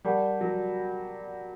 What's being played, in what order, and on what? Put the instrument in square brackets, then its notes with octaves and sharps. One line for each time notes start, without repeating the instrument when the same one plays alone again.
[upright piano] G3 [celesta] G4 A#4 D5 F#5 A5
[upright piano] F#3